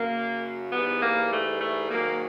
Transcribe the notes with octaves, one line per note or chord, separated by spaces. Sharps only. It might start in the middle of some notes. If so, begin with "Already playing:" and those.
Already playing: F#2 C#3 F#3 A#3
G#2 E3 G3 B3
A#3
A3
A3
G#2 D#3 F#3 A#3